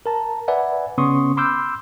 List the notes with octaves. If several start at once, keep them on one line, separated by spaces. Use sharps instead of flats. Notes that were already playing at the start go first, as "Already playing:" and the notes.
A#4 A5 A#5
B4 D5 E5 F#5 G#5
C#3 B3 C#4 C6 C#6 D#6
B5 C6 D6 E6 F6 G6